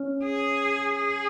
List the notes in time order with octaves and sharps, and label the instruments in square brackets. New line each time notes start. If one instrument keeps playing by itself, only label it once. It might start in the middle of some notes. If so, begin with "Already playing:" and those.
Already playing: [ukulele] C#4
[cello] G#4
G#4